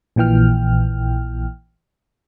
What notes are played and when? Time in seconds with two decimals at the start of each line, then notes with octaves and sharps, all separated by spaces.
0.16 A#1 A#2 E3 G5 F6